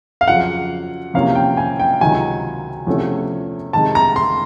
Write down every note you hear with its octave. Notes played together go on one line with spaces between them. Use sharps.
F5
F2 C#3 F#3 F#5
E2 C3 F3 A#3 C#4 F5
G5
G#5
G5
C#2 C3 D#3 F#3 G#5
E2 C3 F3 A3 C#4
C3 D#3 G#3 A5
A#5
C6